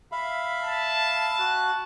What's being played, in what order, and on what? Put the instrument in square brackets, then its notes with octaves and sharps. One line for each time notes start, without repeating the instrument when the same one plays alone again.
[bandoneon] E5 F5 B5
[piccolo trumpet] A5
[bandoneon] F#4 F#6